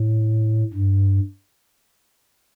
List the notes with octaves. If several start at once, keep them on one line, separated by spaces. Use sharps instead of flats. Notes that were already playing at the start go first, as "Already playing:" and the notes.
Already playing: A2
G2